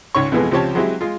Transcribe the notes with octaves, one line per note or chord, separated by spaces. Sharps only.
C#2 G#2 C#5 C#6
F2 B2 E3 G#3 B3 G#4
C#2 F3 C4 G4 C#5 A5
F#3 G#3 C4 E4 G4 G#4
G#3 F4